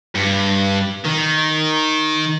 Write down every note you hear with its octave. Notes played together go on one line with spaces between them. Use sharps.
G2
D#3